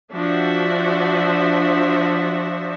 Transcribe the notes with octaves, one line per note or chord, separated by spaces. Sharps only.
F3 D4 F#4 E5